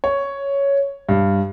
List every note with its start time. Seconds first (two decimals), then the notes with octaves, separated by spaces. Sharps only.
0.04 C#5
1.09 G2